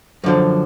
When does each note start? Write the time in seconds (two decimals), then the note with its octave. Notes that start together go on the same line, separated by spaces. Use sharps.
0.24 F#2 D3 F3